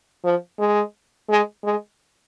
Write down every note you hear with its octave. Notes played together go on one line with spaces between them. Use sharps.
F3
G#3
G#3
G#3